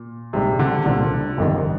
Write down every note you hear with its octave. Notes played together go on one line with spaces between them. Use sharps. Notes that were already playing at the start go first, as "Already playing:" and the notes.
Already playing: A#2
A#1 G#2 C3 G3
D3
C2 A#2 D3 G3 C4 F4
G1 F2 D#3 G3